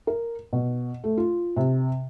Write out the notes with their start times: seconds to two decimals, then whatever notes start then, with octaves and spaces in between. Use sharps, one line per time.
0.07 A#4
0.53 B2
1.04 A3
1.18 F4
1.57 C3